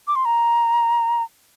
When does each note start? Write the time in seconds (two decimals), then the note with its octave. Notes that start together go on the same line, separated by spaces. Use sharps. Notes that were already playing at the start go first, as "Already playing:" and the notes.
0.07 D6
0.15 C6
0.25 A#5